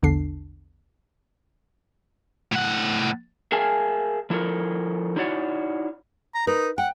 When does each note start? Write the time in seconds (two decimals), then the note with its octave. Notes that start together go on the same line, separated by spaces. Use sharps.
0.02 A#1 E2 D3 D4 C7
2.52 A2 F#5
3.52 G#4 A#4 E5 F5 G#5 A5
4.30 F3 E4 F4 A4 A#4
5.16 D#4 E4 F#4 C#5 D5 F#5
6.34 A#5
6.47 D#4 A#4 B4
6.78 F#5 G5